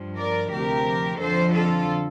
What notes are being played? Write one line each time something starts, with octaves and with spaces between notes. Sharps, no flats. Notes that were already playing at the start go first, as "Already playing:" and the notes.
Already playing: G2 F3
A#4 D5
D2 C3 F3 G4 A#4
F2 D3 F3 A4 C5
F4 A4